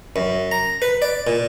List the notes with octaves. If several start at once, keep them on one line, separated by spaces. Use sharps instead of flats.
F#2
A#5
B4
D5
A#2